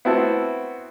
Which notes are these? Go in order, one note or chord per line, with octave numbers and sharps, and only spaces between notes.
B3 C4 E4 F#4 A5